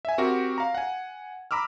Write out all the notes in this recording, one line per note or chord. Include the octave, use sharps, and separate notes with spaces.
E5 G#5
C4 F#4 G4 A#4
F5 A#5
F#5 G#5
A#5 B5 D6 E6 F6